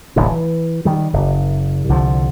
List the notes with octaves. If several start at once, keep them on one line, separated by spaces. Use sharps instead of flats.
D1 A1 D2 C3
E3
D#3 G3
F#1
C2 D3 D#3 F3